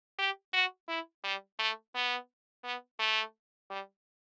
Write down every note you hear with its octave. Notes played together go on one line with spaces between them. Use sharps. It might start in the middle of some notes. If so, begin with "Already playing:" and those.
G4
F#4
E4
G3
A3
B3
B3
A3
G3